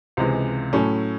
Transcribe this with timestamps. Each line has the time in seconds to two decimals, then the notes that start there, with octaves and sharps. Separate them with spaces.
0.17 C#2 C3 E3 G#3
0.73 A2 F#3 A3 C#4